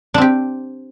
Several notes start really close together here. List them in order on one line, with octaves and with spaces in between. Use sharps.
D4 C4 G4